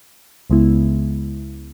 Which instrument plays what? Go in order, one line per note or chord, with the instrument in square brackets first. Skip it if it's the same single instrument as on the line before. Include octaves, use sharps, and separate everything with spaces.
[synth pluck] C#2 C#3 G#3 B3 E4